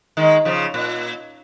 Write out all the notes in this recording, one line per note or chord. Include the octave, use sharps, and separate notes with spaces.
D#3 G#3
C#3 F3
A#2